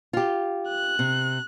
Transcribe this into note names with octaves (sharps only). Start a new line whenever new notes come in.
F4 G4
F#6
C3